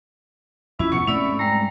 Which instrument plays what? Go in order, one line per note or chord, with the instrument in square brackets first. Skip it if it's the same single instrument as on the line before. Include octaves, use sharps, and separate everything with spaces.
[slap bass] F2 [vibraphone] C#4 F4 [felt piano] E4 [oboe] E5
[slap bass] E2 G2 B2 [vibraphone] F#5 [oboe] C#6 [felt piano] C#7
[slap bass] G#2 A3 C4 [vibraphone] C#4 D5 B5 [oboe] E5
[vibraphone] G3 G#3 [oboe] A#5